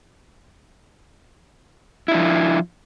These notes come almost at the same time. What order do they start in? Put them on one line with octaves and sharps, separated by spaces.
E4 D4 F3